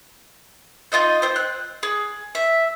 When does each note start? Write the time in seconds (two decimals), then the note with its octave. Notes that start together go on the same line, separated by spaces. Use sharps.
0.92 D#4 F4 D#5 G6
1.22 C4 C5
1.36 F#6
1.83 G#4
2.35 E5